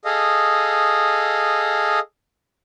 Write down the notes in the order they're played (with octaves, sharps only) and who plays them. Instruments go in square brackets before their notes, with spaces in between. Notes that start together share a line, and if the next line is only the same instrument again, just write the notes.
[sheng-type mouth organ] G#4 A4 D#5 F5